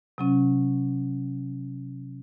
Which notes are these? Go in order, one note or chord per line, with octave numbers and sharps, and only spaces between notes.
C3 F#3 C#4